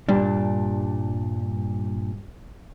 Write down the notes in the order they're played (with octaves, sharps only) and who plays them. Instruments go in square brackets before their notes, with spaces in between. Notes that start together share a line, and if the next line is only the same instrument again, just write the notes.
[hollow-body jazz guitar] G2 A#2 D4 [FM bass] G3